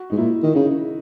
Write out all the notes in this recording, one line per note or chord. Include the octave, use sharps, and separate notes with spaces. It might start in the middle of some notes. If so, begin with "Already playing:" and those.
Already playing: F#4
G#2 D#4
A#2 E4
D#3
C#3 D#4